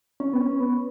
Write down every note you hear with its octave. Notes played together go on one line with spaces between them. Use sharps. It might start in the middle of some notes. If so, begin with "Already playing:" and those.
C#4
B3
C#4
B3